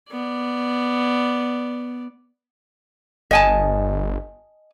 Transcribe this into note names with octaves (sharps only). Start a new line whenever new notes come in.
B3 D5
G1 D#5 G#5 A5